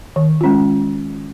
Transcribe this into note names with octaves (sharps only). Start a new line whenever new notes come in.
D#3
G#3 C#4 F4